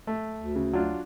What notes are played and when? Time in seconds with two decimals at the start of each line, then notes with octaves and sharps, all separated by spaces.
0.07 A3
0.39 D2
0.56 C#3
0.73 F#3 D4 F4